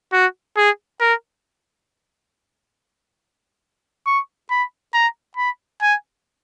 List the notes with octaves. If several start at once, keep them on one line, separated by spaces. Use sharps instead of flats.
F#4
G#4
A#4
C#6
B5
A#5
B5
G#5